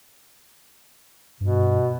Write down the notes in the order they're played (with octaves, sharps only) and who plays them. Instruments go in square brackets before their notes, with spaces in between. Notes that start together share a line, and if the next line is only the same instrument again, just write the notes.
[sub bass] G2 [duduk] B2